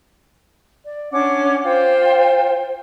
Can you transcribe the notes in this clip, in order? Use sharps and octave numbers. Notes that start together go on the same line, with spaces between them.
D5
C#4 D4 F#5 D6
F4 C5 G5